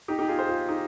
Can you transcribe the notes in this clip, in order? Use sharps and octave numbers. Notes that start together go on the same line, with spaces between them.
D#4 G4
D#4 G4
F4 G#4
G#4 C5
F4 G#4
D#4 G4